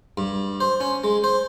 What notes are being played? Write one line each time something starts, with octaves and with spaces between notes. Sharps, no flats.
G2
C5
C#4
G#3
C5